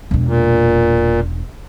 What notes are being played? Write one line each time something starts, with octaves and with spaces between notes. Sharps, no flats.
E1 D4
A#2